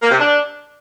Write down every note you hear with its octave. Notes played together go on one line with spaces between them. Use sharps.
A#3
C3
D4